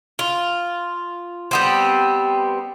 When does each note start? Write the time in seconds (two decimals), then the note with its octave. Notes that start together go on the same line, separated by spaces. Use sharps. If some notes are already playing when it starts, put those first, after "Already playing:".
0.19 F4
1.51 G3 B3 C4